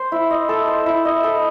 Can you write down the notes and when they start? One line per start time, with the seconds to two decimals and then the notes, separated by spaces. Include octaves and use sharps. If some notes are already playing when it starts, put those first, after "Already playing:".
Already playing: C5
0.12 E4
0.30 D#5
0.49 A4
0.68 C5
0.86 E4
1.05 D#5
1.24 A4